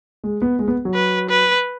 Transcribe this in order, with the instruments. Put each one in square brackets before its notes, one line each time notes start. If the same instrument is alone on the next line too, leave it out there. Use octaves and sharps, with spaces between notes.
[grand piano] G#3
B3
G#3
B3
F#3
[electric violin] B4
B4